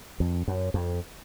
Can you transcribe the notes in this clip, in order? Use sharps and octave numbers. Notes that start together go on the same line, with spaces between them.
F2
F#2
F2